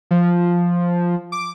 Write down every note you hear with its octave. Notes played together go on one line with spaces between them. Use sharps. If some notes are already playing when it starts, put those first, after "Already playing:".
F3
D6